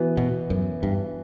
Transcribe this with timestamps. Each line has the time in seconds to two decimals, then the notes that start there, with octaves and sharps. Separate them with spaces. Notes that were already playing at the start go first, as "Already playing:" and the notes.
Already playing: E3 B3 F#4
0.17 B2
0.50 F#2
0.83 G2